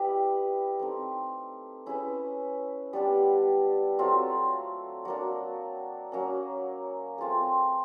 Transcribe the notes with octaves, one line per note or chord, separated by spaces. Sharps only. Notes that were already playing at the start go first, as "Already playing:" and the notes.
Already playing: G3 E4 G4 B4 D#5
A3 C4 D#4
C#4 E4 G#4 B4
G3 B3 D4 G4
F#3 A3 C4 F4
F#3 A#3 D4
F#3 A#3 C#4
A3 C4 F4 G#4